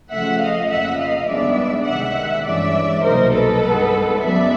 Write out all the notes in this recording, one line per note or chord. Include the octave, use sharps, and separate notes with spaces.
C#3 F3 A3 E5 F#5
D#5 F5
F2 C#3 F3 A#3 E5 F#5
D#5 F5
G2 D#3 G#3 B3 D4 D5 E5
C#2 C3 D#3 G#3 E5 F#5
G2 E3 G#3 C#4 D5 E5
C2 B2 F#3 A#3 D#4 A#4 C5
A4 B4
G2 D#3 G#3 B3
F#2 D#3 G#3 B3 D5 E5